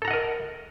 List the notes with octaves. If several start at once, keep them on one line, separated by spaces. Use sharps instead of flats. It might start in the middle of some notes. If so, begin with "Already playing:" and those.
A4 A#4 D#5 F#5 A#5